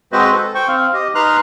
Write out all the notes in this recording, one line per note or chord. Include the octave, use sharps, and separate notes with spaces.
G#3 C4 F#4 B4 C5 D#5
A4
C5 G5 C#6
C4 F5
G4 D#5
D#4 B4 A#5 C6 F6 F#6